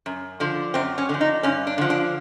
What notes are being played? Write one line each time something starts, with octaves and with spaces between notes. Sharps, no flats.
F#2
D3 F3
F#2 C4
C#4
D3 F3
D#4
G2 C#4
D4
D3 F3
D4